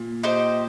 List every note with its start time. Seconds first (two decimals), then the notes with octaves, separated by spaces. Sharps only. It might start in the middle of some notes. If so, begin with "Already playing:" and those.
Already playing: A#2
0.23 D#4 G4 C5